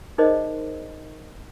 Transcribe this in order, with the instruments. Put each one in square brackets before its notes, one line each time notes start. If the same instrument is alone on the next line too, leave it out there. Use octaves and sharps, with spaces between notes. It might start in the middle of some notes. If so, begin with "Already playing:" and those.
[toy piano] D#4 G#4 A#4 C5 D5 D#5